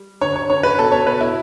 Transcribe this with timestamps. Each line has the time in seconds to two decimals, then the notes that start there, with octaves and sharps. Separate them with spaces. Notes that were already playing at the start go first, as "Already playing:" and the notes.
Already playing: G3
0.21 D3 C#5
0.36 C#5
0.50 D3 C#5
0.63 B4
0.78 B2 A4
0.92 C#5
1.06 B2 B4
1.21 E4